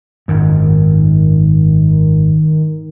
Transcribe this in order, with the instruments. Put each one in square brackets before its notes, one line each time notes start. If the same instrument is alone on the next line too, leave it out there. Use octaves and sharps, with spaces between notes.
[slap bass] G#1 F#2 [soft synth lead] D#3